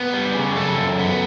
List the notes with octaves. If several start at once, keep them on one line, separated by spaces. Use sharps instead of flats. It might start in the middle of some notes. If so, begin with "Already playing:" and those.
Already playing: B3 G4
G3
C#3
F#2 A4
F#2
B3